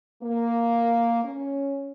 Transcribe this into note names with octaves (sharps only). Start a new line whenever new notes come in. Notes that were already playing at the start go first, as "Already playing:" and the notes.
A#3
C#4